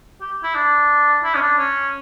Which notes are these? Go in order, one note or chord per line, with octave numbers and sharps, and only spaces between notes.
G4
E4
D4
E4
C#4
D4
C#4